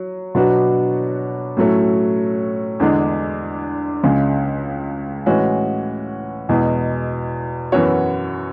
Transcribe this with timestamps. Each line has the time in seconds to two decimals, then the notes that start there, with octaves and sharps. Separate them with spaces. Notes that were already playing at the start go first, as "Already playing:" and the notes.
Already playing: F#3
0.35 B2 F#3 B3 D4 F#4
1.57 A2 F#3 A3 C#4
2.80 E2 D3 G#3 D4
4.03 C#2 C#3 G#3
5.26 A2 E3 G#3 C#4 F#4
6.49 E2 B2 G#3
7.72 F#2 E3 B3 F#4 C#5